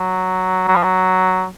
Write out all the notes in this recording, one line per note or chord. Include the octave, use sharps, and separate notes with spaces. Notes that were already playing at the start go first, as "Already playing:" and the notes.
Already playing: F#3
F#3
F3
F#3